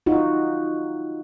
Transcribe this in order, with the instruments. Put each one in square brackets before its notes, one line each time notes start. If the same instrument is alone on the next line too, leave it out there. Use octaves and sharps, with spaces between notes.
[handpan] D#4 F4 F#4